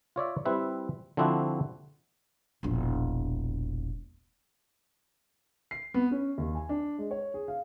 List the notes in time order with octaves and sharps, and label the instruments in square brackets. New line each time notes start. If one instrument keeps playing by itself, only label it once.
[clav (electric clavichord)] F4 C#5 D5 E5
G3 C4 E4 B4 E5
D3 F3 C4 D4 E4 F#4
[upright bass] E1 A#1
[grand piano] C7
B3
C#4
D#2
G#5
D4
G#3
C#5
G#4
F5